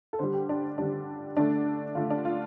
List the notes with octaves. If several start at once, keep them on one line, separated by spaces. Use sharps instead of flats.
A4
D3 G3 C5
G4
D4
D3 G3 D4
D3 A3 D4
D3 A3 F4
D4
F4